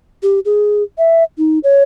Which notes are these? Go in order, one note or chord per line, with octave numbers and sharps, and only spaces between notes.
G4
G#4
E5
D#4
C#5